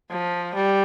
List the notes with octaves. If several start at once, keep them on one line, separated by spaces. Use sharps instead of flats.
F3
G3